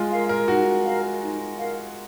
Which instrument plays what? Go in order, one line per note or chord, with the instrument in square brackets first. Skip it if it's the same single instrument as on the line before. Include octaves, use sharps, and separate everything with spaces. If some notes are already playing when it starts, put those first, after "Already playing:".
Already playing: [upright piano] G#3 F4
[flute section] A#4 F5
[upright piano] A#4
[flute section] D#4 [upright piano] F#4
[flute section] A#4 F5
D#4
A#4 F5